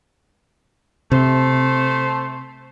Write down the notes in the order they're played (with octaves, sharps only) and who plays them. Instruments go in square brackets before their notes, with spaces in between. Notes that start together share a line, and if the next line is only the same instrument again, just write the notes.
[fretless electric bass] C3 [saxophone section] A3 C5